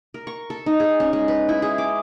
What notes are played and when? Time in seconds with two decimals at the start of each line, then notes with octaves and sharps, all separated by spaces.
0.14 A#4
0.27 C#6
0.50 A4
0.66 D#4
0.80 G#4
1.00 C#4
1.13 G#3
1.28 B4
1.49 E4
1.62 G#4
1.78 D6